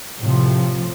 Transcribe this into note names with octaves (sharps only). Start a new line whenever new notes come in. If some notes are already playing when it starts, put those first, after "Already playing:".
A2 C3 F3